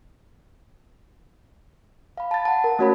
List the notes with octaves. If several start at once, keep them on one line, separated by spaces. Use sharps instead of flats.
F5 B5
A5 A6
F#5 A5
A#4
A3 C#4 F#4 C#5 A5 B5